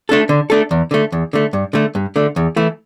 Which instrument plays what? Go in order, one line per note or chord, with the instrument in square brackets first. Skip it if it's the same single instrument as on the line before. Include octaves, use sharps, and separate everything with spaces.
[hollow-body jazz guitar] A3 D4 A4
D3
A3 D4 A4
E2
D3 A3
E2
D3 A3
G2
D3 A3
G2
D3 A3
E2
E3 A3 E4